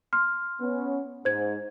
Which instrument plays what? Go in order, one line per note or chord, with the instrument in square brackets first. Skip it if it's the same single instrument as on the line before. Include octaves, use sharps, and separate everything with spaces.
[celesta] C6 F6
[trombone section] B3 C#4
[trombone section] G#2 [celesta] C5 G#6